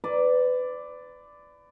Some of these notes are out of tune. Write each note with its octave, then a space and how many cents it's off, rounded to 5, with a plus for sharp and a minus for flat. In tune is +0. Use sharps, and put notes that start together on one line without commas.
B4 +30 D5 +0